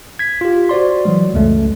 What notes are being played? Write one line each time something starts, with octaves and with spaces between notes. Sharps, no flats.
G#6 B6
F4 G4
F#4 C5 D5 C6
E3 F#3 G#3
C#2 F#2 G#3 A3